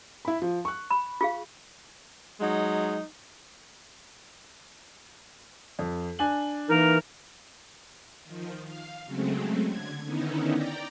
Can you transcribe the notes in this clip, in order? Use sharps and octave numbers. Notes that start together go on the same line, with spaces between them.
E4 B5
F3
C#6 F#6
B5
F4 G#4 F5
F#3 G#3 D#4
F2
D4 G#5 F#7
E3 A#3 D#4 A#4
D#3 F3
F5
C#3 F#3 G#3 A3 C4
D3 G#6
D3 D#3 B3 C#4 D#4 E4
D5 G5 A#5